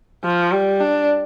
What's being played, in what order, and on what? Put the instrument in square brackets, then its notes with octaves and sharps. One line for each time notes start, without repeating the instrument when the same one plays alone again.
[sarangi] F3
G3
D4